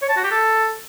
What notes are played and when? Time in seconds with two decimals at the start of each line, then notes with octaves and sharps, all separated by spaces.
0.02 C#5
0.09 A5
0.17 F#4
0.24 G4
0.31 A4